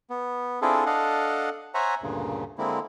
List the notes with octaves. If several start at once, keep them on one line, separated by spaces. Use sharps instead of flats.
B3
C4 D4 E4 F4 G#4 A4
D4 A4 D#5 F5 F#5
C5 C#5 E5 F#5 G#5 A#5
D2 G2 A#2 C#3
D3 G#3 A#3 C4 E4